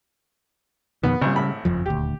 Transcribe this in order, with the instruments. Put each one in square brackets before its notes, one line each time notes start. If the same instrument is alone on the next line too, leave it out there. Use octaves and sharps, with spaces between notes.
[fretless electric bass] F2 B2 D#3 [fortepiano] B3
[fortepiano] G#1 A#2 [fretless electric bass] C#3 G3
[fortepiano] G#1 A2 B5
[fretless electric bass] F#1 F2 F3
[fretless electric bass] D#1 D2 [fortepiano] G4